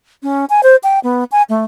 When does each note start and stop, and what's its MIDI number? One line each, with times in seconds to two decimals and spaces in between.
0.23 0.45 61
0.50 0.61 80
0.63 0.76 72
0.84 0.99 79
1.04 1.24 59
1.32 1.42 80
1.49 1.65 57